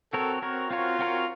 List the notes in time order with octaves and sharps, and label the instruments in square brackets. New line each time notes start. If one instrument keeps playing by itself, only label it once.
[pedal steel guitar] C4 F#4 A#4 C#5 [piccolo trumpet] A4
[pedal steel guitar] C4 F#4 A#4 C#5
[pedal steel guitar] C4 F#4 A#4 C#5 [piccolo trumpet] F4
[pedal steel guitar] C4 F#4 A#4 C#5